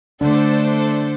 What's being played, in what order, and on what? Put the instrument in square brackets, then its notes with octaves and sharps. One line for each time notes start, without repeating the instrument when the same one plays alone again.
[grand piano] D3 [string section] A3 D4 A4 C5